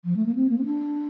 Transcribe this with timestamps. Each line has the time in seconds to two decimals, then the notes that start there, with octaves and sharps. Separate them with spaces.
0.05 F3
0.16 A3
0.26 A#3
0.35 C4
0.50 A#3
0.58 C4
0.65 D4